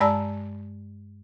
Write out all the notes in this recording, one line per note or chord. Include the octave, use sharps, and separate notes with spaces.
G2 G#3 D5 A5 A#5 E6